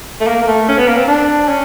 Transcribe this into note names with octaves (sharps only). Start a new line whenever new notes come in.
A3
A#3
A#3
A3
C#4
B3
A#3
C4
D4
C#4